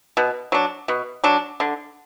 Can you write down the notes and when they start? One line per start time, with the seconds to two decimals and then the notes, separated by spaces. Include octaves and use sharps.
0.17 B2
0.52 F#3 D4
0.88 B2
1.24 F#3 D4
1.60 D3